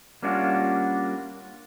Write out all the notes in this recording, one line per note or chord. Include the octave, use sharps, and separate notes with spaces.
G3 A#3 C#4 D4 F4 F#4